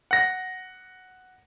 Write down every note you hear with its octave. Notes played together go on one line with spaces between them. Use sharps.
F#5 A#6